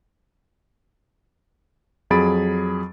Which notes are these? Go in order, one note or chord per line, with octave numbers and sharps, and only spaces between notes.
F2 F#3 G#4 B5 A6 D7